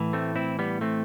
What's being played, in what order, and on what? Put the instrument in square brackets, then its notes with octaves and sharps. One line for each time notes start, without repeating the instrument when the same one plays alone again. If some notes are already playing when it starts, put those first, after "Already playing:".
Already playing: [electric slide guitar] A2 E3
A3 C4
C4 E4
G3 B3
A3 C4